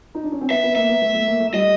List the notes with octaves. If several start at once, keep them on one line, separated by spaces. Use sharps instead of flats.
D#4
D4
C#4
C4
B3 E5
B3
A#3 E5
B3
A3
A3
A#3
A3
G3 D#5